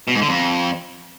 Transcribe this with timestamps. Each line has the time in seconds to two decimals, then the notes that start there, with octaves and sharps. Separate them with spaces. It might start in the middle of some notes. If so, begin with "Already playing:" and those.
0.08 B2
0.15 G#2
0.22 D3
0.29 F2